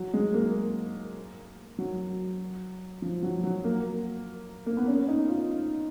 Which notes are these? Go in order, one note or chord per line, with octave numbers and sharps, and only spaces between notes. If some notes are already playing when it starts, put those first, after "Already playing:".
Already playing: F#3
G#3
A#3
F#3
F3
F#3
F#3
A#3
A#3
B3
C#4
D#4
F4